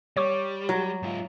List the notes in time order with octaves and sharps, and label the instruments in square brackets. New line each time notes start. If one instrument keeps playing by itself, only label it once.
[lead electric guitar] G3 [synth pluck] C#5 C#6 D6
[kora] F#3
[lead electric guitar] G#2 F4